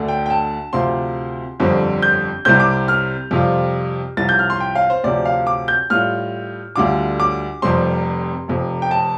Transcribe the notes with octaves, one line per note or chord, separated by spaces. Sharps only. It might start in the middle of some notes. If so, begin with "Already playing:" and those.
Already playing: D2 D3 A3 D4
G5
G5
A5
D2 C3 F3 C4 F4 C6
G1 F2 D3 G3 C4
G6
C2 C3 G3 C4 G6
D6
F6
F2 C3 G3 F4
C2 C3 F3 A6
G6
F6
C6
G5
F5
C5
D2 C3 F3 D5
F5
D6
G6
A2 G3 F4 F6
D2 D3 G3 F4 D6
D6
F1 F2 C3 G3 C4 C6
F1 F2 C3
G5
A5